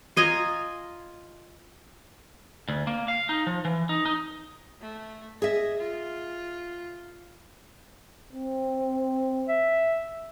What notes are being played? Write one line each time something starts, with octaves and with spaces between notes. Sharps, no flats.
F4 D#5 G#5 A#5
D2
A#3
F5
D#4
F3
E3
D#4
D#4
A3
G#4 D#5 E5
F4
C4
E5